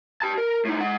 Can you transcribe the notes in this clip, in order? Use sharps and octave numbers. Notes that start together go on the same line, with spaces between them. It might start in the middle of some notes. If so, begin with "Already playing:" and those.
G4 A5
A#4
A2 D#4
G#3 F#5